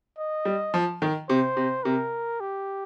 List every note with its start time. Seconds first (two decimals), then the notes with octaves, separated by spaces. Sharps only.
0.18 D#5
0.45 G3
0.74 F3
1.02 D#3
1.29 C3 C5
1.57 C3
1.84 C3 A#4
2.41 G4